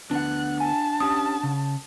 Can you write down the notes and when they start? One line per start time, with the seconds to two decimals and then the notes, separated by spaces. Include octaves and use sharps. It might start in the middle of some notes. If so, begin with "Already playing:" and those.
0.11 D2 B3 D4 F#5 F#6
0.60 G#5 A5
1.00 C#4 G4 D#6
1.43 C#3